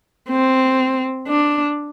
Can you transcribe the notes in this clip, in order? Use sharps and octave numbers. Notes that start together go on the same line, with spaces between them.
C4
D4